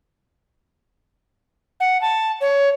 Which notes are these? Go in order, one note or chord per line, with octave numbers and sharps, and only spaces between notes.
F#5
A5
C#5